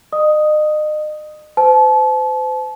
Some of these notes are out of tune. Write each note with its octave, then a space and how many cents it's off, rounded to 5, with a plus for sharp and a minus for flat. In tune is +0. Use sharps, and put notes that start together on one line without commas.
D#5 -35 D#6 +5
C5 -40 A5 -35